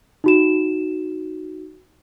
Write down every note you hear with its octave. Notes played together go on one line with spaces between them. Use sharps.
D#4 F#4 E7